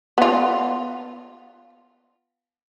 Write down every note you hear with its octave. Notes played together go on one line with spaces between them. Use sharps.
B3 F4